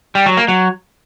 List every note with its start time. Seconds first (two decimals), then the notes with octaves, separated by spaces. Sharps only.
0.15 G3
0.26 F#3
0.37 A#3
0.48 F#3